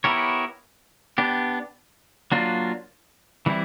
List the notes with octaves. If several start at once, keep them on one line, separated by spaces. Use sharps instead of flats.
B3 E4 G4 A#4 C#5
B3 D4 G4
F#3 A#3 D4 F4
E3 G3 C4 E4